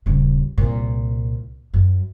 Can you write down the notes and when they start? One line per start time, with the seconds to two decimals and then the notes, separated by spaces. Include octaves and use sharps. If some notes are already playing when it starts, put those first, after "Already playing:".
0.06 D#1 C#3
0.58 C2 A#2
1.74 F#2